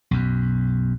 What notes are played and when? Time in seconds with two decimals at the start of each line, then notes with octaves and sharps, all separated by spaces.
0.11 B1 F#2